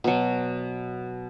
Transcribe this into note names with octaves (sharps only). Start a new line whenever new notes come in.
B2 F#3